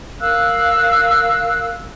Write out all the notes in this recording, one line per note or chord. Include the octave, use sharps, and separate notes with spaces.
A#4 F5 E6 F#6